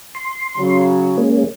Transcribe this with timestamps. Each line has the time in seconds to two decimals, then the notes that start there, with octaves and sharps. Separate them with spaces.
0.15 C6
0.56 C#3 F#3
1.17 G#3 A#3 C#4